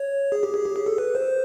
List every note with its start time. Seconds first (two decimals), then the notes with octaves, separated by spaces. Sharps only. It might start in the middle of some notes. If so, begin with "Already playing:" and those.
Already playing: C#5
0.32 G#4
0.43 G4
0.54 G#4
0.65 G4
0.76 G#4
0.86 A4
0.98 B4
1.15 C5